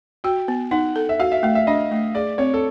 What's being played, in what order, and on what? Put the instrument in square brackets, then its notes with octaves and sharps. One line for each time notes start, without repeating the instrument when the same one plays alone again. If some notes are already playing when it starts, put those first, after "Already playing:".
[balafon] F#4 [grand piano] G5
[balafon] B3
[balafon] D#4 [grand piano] F#5
[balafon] A4
[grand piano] E5
[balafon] F#4 [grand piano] F5
[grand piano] E5
[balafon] A3 [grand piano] F5
[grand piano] E5
[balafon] D4 [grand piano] D#5
[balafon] A3
[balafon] G#4 [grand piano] D5
[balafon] C4 [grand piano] C#5
[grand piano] A4